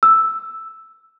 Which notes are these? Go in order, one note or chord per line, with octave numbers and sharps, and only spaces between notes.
E6